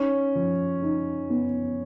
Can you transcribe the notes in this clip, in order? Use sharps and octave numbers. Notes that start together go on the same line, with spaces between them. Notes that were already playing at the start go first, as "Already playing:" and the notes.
Already playing: C#4 D#4
F3
D#4
B3